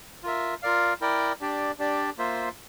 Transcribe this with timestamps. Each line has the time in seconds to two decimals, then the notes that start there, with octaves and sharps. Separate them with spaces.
0.23 F4 A#4 E5
0.63 F4 A#4 D5 F5
1.01 E4 A#4 D5 G5
1.41 D4 G4 D5
1.79 D4 G4 D5
2.18 A#3 F4 C5 E5